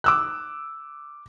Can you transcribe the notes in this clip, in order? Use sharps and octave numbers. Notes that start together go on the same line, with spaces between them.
D6 E6 F#6